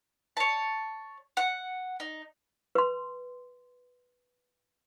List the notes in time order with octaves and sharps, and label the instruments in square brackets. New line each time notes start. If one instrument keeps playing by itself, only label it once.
[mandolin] C#5 A5
F#5
D#4
[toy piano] B4 C6